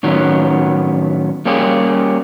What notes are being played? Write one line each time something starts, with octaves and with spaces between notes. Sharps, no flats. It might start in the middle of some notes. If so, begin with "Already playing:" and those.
A2 D#3 F#3 B3 C#4
G3 A#3 C#4 G4 G#4